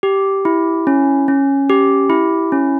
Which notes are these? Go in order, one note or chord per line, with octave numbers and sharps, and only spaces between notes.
G4
E4
C#4
C#4
G4
E4
C#4